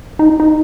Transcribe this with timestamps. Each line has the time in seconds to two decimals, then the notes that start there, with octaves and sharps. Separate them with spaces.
0.19 D#4
0.40 D#4